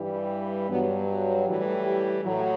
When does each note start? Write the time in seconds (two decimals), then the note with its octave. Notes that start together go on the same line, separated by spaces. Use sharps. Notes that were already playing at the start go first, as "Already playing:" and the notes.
Already playing: G2 E3 G3
0.69 G2 F#3 B3
1.46 A2 E3 G3
1.84 G4
2.24 A2 F#3